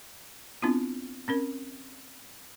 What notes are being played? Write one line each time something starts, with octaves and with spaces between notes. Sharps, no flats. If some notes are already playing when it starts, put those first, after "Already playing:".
B3 C4 D4 E4 F4
C4 C#4 A#4